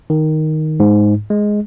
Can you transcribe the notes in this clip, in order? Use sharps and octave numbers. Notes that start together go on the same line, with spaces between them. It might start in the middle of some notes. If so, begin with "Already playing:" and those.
D#3
G#2
G#3